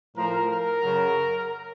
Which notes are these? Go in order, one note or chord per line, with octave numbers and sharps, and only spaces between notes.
A2 F3 A#4
A#4
F#2 C#3 F#3